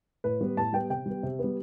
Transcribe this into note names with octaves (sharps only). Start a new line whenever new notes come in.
A2 B4
G3 B3
A2 A5
G3 B3 G5
C3 G5
G3 B3
C3
G3 B3